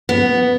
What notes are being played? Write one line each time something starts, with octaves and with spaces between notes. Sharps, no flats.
B3